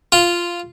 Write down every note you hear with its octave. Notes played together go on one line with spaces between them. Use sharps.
F4